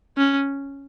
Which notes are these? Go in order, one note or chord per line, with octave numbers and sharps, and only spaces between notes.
C#4